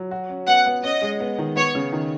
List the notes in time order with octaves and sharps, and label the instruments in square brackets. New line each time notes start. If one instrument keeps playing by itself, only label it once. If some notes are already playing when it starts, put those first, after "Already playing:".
Already playing: [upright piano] F#3
F#4
C#4
[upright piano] B3 [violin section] F#5
[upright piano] B3
[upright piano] C#4 [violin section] D#5
[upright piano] G#3
B3
D#3
[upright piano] B3 [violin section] C#5
[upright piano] C#3
D#3